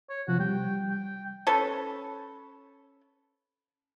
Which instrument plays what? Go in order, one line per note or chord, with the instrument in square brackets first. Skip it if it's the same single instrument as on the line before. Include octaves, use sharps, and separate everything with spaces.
[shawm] C#5
[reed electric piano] C3 F3 [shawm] F#4
[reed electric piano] G3 [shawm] G5
[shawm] G5
[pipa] C#4 A4 B4